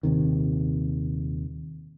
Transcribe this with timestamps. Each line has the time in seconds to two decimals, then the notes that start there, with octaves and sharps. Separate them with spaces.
0.03 D#1 D#2 C3 D#3